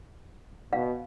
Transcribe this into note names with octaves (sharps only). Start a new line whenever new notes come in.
B2 F5